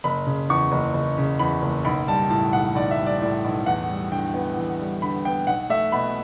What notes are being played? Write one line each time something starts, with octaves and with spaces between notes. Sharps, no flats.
F#1 B5
C#3
E2 C#6
F#1
F#1
C#3
E2 B5
F#1
B1 B5
G3 A5
A2 A5
B1 F#5
B1 D5
E5
G3
D5
A2 D5
B1
E2 F#5
G3
D3 G5
B3
E2
G3
D3 B5
B3 G5
B1 F#5
A3 E5
B2 B5